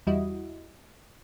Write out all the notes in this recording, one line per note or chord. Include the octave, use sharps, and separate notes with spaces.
E2 G3 E4 F#4 D#5